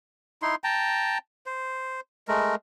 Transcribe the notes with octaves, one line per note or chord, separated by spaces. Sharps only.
D#4 E4 C6
G5 A5 A#5
C5
G#3 A3 A#4